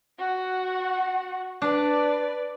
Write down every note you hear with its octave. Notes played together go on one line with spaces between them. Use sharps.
F#4 F#5
D4 B4 D5